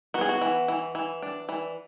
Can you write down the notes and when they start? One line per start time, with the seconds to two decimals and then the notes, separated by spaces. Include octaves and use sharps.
0.14 B3 F#4
0.21 G#4
0.29 F#4
0.41 E3
0.68 E3
0.95 E3
1.22 D4
1.49 E3